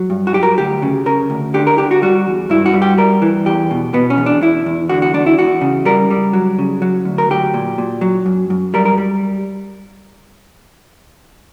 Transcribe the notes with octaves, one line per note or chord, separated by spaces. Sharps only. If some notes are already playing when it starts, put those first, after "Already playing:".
Already playing: F#3
G2
F#4
F#3 G4
A#4
D2 G4
C#3
C#3 A#4
D2
D3 G4
A#4
D3 G4
F#4
G3 F#4
E2
G2 E4
F#4
G3
G4
G3 A#4
E3
E2 G4
B2
B2 B3
C#4
E2
D4
E2 E4
E2
D3 F#4
F#4
E2 D4
E4
E2 F#4
C#3
G3 A#4
G3
F#3
C#3
F#3
D2
A#4
F#3 G4
A#2
A#2
F#3
F#2
F#2
G3 A#4
A#4
G3